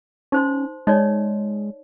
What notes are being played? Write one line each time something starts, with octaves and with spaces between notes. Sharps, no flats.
C#4 D#4 C5 C6
G#3 D#4 C#5 D5